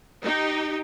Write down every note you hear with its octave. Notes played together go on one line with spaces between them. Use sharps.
D#4 G4